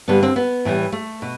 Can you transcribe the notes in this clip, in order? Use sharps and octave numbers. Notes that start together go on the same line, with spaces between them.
G2 D3 G3 B3
C4
B3
A2 E3 G3
A3
B2